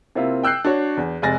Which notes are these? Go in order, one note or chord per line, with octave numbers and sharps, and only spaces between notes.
C3 A#3 C4 E4 F4
G5 E6 F#6 G6 C7
D4 F#4 C#5
E2
F1 G#3 G#5 A6 A#6